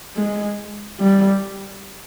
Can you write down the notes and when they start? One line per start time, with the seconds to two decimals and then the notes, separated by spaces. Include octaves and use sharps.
0.16 G#3
1.00 G3